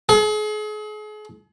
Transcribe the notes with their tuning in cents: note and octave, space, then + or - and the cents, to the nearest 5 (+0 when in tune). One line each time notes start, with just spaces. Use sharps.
G#4 +40